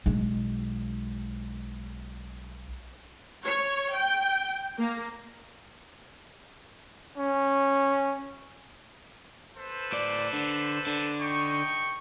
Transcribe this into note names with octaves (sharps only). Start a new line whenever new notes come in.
B1 G#3
C#5
G5
A#3
C#4
A4 B4 C5
A2 D5
D3
D3
D#4 G5 C#6